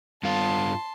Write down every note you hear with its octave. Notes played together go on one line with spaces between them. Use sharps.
G2 F4 A5 C6